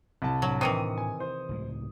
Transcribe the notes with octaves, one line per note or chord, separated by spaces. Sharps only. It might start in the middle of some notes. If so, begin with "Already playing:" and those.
C2 A5
A2 F#3 D4
C3 D#3 E3 D#6 C#7 D#7
G#5
C5
C#2 A2 G#3